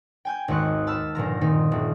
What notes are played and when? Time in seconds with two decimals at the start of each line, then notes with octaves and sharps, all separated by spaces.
0.25 G5 G#5 G6
0.48 G#1 D#2 D#5 C#6 F#6
0.87 A5 B5 E6 F6
1.15 G1 A#2 F3 A#5
1.41 A#2 D#3 C4 D#4
1.72 D#1